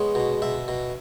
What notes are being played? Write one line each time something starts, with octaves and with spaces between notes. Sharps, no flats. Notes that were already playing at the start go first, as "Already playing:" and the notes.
Already playing: G#3 B3 C#5
B2
B2 E5
B2